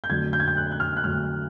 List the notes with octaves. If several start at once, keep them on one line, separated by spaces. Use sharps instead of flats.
G6
F2 D3 F#3 A3 G#6
G6
G#6
G6
F#6
F#6
F6
F#6
F2 D3 F#3 A3 F6